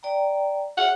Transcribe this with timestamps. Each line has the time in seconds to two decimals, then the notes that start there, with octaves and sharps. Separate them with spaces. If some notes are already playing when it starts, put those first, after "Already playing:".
0.03 D5 G5 A#5
0.77 G#4 C#5 F#5